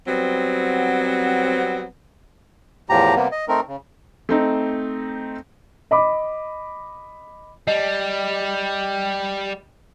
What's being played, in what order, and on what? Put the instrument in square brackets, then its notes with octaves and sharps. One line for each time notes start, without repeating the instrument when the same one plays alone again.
[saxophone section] F#3 G3 B3 C4
[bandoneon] E2 A2 F3 G4 A#5
C3 G3 A#3 B3
D#5
A3 C4 D#4 A#4
C#3
[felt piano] A3 C4 D#4
[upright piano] D#5 B5 D6
[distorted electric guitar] G3 [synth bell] D#5